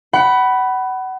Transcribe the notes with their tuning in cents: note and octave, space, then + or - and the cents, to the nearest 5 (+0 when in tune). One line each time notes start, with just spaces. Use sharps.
F#5 +30 B5 +0